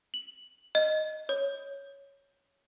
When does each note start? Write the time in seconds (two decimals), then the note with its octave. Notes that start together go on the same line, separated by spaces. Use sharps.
0.14 F#7
0.75 D#5
1.29 C#5